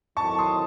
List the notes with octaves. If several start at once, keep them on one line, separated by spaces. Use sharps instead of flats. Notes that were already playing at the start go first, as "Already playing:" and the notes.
D#3 F#3 C4 E4 A4 A5 C#6
C6 D#6